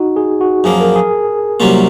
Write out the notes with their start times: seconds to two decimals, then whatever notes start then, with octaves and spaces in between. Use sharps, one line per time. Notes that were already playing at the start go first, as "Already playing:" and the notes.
Already playing: D#4 F#4
0.16 G#4
0.41 F#4
0.64 F#2 F3 A#3 G#4
0.80 A#4
0.96 G#4
1.60 C2 C3 F#3 A#3 C#4 F4